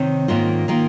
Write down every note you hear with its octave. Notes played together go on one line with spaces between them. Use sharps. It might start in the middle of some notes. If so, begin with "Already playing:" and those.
Already playing: C3 D#3 D#4 C#5
G#2 D#3 A#3 F4
D#3 A#3 F4